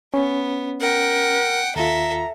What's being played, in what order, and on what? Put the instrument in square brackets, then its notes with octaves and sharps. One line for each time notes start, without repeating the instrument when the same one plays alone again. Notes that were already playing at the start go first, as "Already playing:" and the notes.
[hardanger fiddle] B3 [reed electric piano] C#4
[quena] A#4 [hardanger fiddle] F#5 G5
[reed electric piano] D#2 F4 [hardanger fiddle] A4 E5 [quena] A#5